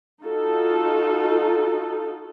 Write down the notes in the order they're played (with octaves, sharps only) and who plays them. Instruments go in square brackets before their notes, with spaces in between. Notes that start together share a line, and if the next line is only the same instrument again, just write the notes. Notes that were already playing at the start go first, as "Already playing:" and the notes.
[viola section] D#4 F4 F#4 A4